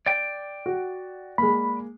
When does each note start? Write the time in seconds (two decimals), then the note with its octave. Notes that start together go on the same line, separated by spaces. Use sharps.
0.06 D5 G5
0.66 F#4
1.38 G#3 A#3 B5